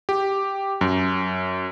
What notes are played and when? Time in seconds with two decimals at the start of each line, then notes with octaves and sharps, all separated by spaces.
0.09 G4
0.81 F#2